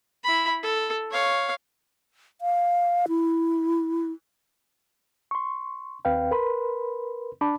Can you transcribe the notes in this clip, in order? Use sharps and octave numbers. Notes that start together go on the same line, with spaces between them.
E4 B5
A4
C#5 F5
F5
E4
C6 C#6
D#2 C4 B4 F5 G5
A#4 B4 B5 C6
D4 D5 A5 B5 D6